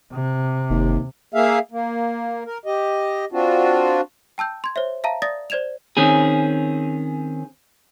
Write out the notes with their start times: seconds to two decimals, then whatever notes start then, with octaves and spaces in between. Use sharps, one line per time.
0.13 C3
0.70 F#1 D#2
1.34 A#3 G#4 E5 F5
1.71 A#3
2.46 A#4
2.66 G4 D#5
3.32 C4 D4 F4 F#4
4.38 G5 A5 E6 G6
4.64 C6 G#6
4.76 C5 C#5 E5
5.04 E5 F5 A5 A#5
5.22 D5 D#6 A6 A#6
5.50 C5 D5 G#6 E7 F7
5.97 D#3 C4 C#4 G#4